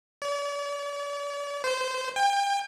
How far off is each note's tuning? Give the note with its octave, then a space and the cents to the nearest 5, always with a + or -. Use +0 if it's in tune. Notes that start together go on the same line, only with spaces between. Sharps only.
D5 -45
C5 -20
G5 +35